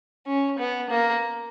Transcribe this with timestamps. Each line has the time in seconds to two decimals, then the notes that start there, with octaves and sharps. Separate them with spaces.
0.27 C#4
0.59 B3
0.90 A#3